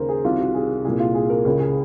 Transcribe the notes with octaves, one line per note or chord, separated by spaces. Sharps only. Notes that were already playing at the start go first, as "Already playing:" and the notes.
Already playing: D#2 C#3 A#4 C5 A#5
G#4
C2 C3 D#3 F4
F#4
G#4
C2 A#2 G#4
F4
G#4
A#4
C#2 C#3 A#4
G#4